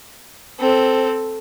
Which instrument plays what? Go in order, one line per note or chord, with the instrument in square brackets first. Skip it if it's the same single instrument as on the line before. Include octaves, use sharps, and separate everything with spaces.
[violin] C4 A4